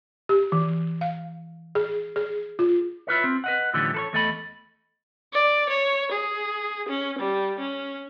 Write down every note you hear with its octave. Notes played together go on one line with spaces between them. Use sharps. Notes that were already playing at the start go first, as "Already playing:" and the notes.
G4
E3
F5
G#4
G#4
F4
E4 F4 B4 C#5
C4
B4 D#5 F#5
A2 D3 E3 F3 G3 C#4
A4 B4 C#5
E2 A3 A4 D#5 F#5 B5
D5
C#5
G#4
C#4
G3
C#4